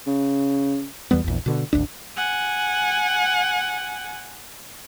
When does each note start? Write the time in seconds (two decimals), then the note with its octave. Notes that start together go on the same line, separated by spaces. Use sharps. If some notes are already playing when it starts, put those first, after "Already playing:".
0.06 C#3
1.11 E2 E3 G3 B3
1.24 A#1 E2
1.46 B2 D3
1.73 G#1 D2 D4
2.17 F#5 G#5